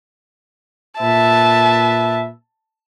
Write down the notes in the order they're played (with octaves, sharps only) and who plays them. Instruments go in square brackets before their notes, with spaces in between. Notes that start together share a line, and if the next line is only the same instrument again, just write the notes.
[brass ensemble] A#2 B4 E5 [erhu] A5